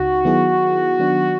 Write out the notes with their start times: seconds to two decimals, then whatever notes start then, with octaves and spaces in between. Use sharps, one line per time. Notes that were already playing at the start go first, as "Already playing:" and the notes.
Already playing: C#2 C#3 D#4 F#4
0.25 D#3 F#3 B3 E4 G#4
0.99 D#3 F#3 B3 D4